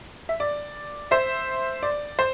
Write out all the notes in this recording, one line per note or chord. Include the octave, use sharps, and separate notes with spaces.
E5
D5
C5 E5
D5
C5